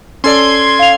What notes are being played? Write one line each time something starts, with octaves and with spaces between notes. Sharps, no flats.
C#4 A4 D5 C6 G#6
F5 F7